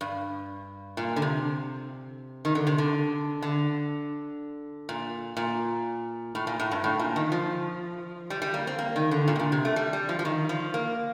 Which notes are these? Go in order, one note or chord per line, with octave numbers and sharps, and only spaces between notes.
G2
A#2
D3
C3
D#3
D3
C3
D3
D3
A#2
A#2
A2
A#2
A2
G2
A2
A#2
D#3
F3
G3
G3
A#3
C4
A#3
D#3
D3
A#2
C3
A#2
C3
A3
G3
G3
F3
F3
D#3
F3
A#3